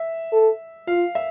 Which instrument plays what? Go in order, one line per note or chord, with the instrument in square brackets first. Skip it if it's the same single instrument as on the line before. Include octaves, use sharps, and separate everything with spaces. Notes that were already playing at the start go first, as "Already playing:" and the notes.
Already playing: [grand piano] E5
[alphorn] A4
[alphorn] F4 [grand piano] F5
[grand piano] E5